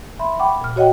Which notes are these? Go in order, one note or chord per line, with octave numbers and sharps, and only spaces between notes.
E5 B5 C6
F#5 G5 B5 C#6 D6
A#2 F6
F#4 C#5 D#5 F#5 G5